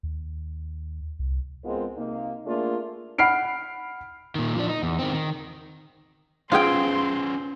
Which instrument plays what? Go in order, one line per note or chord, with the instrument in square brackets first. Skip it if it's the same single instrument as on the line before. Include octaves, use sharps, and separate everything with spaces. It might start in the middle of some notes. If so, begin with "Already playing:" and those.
[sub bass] D#2
C2
[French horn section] G#2 G#3 B3 C4 F4 A#4
C3 A#3 D#4
A3 A#3 D4 F4 G#4 A#4
[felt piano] F#5 B5 F6 C7 D7
[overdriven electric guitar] A#2 D#3
F3 D4
D#4
E2
D#3 C4
D#3
[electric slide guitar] C#4 B4 C5 [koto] F4 G#4 G5 [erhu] C6